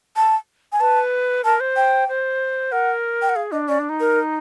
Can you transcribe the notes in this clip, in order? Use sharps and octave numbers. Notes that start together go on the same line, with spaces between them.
A5
G#5
B4 A5
A#4 A5
C5
G5
C5
A#4 F#5
G5
F#5
G#4 F5
D4 D#5
C#4 D5
D4
D#4
A#4